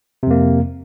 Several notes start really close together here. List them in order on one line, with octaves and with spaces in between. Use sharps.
C3 F2 A#3